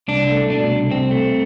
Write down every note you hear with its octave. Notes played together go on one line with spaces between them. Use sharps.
C2 D4
A3
B2 D4
C2
C2 C4
A3